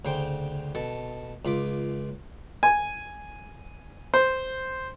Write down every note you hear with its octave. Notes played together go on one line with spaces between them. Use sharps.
D2 C#3 C5 G5 C6
B2 A4 A5
C#2 F4 B5 D6
G#5
C5